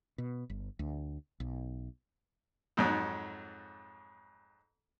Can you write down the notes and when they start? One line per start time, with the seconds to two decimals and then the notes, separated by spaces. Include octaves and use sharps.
0.18 B2
0.50 G1
0.79 D2
1.40 B1
2.77 F2 G#2 F#3